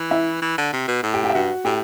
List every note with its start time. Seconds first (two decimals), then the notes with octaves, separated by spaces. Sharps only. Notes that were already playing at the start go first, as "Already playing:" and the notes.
Already playing: E3
0.11 E4 E5
0.42 E3
0.58 D3
0.73 C3
0.88 B2
1.03 A2
1.14 G4 G5
1.24 G4 G5
1.30 E5
1.34 G2 F#4 F#5
1.65 A2 G4 G5